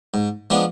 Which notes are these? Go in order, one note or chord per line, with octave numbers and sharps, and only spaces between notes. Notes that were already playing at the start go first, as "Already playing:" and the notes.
G#2
F3 G#3 B3 D4